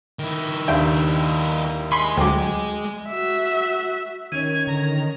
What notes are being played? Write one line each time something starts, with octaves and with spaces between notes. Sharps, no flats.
D#3 E4
D#2 D4 E5 G5
D#5 G#5 B5 C6
D2 F#3 G#3 G5 D6
F#4 E5
D#3 C#4 G#6 D#7
D3 A#5